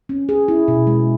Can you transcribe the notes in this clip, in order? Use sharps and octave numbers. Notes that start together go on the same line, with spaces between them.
C#4
G#4
E4
B2
G#3